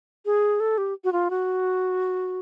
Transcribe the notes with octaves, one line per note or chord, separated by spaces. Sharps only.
G#4
A4
G4
F#4
F4
F#4